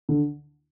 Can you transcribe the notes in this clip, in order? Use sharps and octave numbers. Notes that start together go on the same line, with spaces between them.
D3